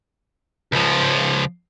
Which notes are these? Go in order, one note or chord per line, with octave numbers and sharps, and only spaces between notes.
C#2 F3